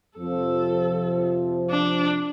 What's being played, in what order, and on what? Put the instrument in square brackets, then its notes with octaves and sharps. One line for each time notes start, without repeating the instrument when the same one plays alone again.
[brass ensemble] F2 C3 F3 [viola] A4
[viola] D4